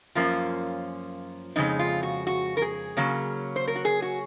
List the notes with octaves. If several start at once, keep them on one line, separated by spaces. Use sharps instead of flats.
F#2 F3 A#3 C#4 F4
F2 C#3 G#3 D#4
F4
F#4
F#4
A#4
G#4
C#3 F#3 A#3 C#4
C5
A#4
F#4
G#4
F#4